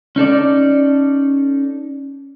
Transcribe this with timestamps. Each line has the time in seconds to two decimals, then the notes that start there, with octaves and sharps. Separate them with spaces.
0.16 C#4 D#4 A4 D5